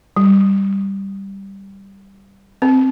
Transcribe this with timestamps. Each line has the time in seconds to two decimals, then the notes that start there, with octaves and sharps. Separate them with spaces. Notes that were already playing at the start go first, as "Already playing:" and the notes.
0.17 G3
2.62 C4